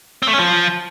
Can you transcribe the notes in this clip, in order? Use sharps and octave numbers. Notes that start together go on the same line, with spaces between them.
C4
A3
C#4
F3